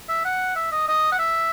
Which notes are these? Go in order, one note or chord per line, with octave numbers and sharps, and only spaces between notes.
E5
F#5
E5
D#5
D#5
F#5
E5